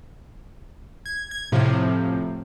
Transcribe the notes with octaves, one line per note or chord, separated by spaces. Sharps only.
G#6
G#6
A2 C3 F3